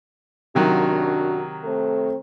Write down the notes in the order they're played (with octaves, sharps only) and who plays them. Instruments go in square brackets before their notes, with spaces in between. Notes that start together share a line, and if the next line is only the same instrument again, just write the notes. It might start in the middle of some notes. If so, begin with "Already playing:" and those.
[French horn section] F#2 D4 F#4 [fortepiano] C3 D#3 F#3
[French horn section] A3 C4 A4